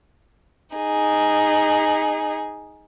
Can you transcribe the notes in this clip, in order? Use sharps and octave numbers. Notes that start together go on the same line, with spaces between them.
D#4 G#4